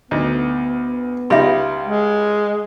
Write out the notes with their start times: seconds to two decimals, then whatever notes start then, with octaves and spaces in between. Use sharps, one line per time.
0.11 D2 B3 D#4
1.30 C#2 G3 D#4 E5 F5 B5
1.83 G#3